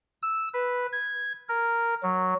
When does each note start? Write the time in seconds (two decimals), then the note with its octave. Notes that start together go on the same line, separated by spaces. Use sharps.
0.22 E6
0.54 B4
0.92 G#6
1.49 A#4
2.03 F#3